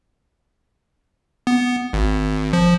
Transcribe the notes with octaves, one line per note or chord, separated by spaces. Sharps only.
B3
G#1
F3